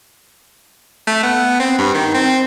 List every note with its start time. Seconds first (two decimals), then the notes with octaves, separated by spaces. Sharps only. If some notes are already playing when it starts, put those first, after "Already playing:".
1.07 A3
1.23 B3
1.60 C4
1.79 G2
1.94 D#3
2.15 C4